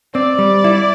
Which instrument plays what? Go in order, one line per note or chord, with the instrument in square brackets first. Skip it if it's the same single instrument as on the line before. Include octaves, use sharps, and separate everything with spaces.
[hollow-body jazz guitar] C4 [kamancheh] D5
[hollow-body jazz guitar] G3
E4